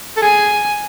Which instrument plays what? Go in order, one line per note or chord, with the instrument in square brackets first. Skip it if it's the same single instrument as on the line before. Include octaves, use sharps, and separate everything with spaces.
[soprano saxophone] A4
[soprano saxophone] G#4 [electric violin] G#5